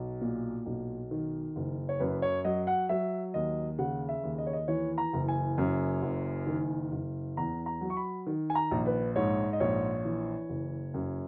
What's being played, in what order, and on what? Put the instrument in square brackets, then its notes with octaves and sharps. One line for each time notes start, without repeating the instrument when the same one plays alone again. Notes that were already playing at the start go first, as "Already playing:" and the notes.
Already playing: [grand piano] B1
A#2
B1
D#3
F#1
C#5
F#2 B4
C#5
F#3 D#5
F#5
F#3 E5
D#2 D#5
C#3 F#5
E5
D#2
D#5
C#5
D#5
E3 C#5
A#5
F#1
G#5
F#2
F#1
D#3
F#1
E2 A#5
A#5
F#3
C#6
B5
D#3
G#5
A#5
A#1
B4
G#2 C#5
D#5
A#1 C#5
E3
F#1
F#2